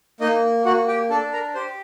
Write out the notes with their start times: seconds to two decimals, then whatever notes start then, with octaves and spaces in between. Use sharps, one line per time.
0.21 A#3 D#4 D#5
0.65 A#3 F#4 F#5
0.88 G4 G5
1.10 D4 A4 A5
1.33 A#4 A#5
1.54 G4 C5 C6